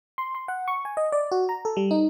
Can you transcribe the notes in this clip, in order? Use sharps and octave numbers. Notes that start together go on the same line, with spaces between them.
C6
C6
F#5
C#6
G#5
D#5
D5
F#4
A#5
A4
G3
D#4